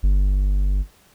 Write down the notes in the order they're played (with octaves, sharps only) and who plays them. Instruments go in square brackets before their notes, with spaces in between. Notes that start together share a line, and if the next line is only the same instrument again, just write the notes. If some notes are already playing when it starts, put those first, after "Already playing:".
[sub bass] G1